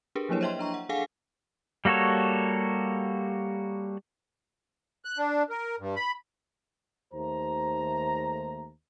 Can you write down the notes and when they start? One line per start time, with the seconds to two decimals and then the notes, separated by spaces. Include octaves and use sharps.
0.15 D4 G4 G#4 A#4 B4
0.29 F3 F#3 A#3 D4 E4 C#5
0.41 C5 C#5 D#5 E5 G5 C6
0.59 D4 A#5 C#6
0.74 F#5
0.89 D4 G#4 A4 F5 F#5 G#5
1.85 G3 A#3 F#4 A4 C#5
5.05 F#6
5.18 D4
5.50 A#4
5.80 G2
5.96 B5
7.13 D#2 A3 C5 A#5